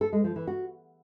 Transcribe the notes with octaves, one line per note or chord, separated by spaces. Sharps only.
A4
G#3
F3
E3
F#4